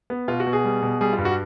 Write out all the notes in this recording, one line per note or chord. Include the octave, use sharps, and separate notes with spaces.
B3
B2 F4
F#4
B2
G#4
G3
B2
G3 G#4
F4
G2
F#4